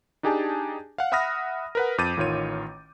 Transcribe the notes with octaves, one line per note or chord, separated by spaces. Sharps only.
D4 D#4 G4 G#4 G#5 A5
F5 F#5
E5 F#5 B5 D#6 F6 A#6
A#4 B4 F#5
F2 D6 G6 A6 D#7
A1 D#3 F4 C#5 D#7